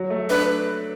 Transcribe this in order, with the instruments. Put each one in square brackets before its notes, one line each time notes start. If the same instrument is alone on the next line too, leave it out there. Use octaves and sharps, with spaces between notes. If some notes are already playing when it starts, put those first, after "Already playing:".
Already playing: [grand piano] F#3
A3
[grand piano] D4 [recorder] B4